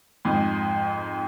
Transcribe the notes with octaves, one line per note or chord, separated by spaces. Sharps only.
F2 G#2